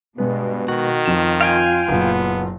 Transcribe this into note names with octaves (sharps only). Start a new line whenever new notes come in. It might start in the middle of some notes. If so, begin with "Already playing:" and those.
G2 B2 G#3 B3
D#3 F#4
F2 F4 E7
F5 G5 G#5
F#1 A#2 B3